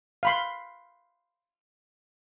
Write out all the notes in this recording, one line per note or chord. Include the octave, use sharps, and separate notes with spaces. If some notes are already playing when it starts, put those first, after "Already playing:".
F5 B5 C6